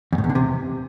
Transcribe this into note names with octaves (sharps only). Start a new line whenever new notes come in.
E2
A2
E2
D3
C3